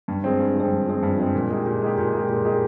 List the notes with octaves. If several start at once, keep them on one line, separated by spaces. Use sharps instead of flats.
G2
F3 G#3 C4
G2
F3 G#3 C4
G2
F3 G#3 C4
G2
F3 G#3 C4
A#2
G#3 D#4 G4
A#2
G#3 D#4 G4
A#2
G#3 D#4 G4
A#2
G#3 D#4 G4